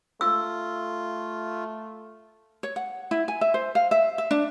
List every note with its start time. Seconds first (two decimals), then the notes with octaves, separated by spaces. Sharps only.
0.21 A3 F4 E6
2.63 C#5
2.76 F#5
3.11 E4
3.28 G#5
3.41 E5
3.54 C5
3.75 F5
3.91 E5
4.18 E5
4.31 D4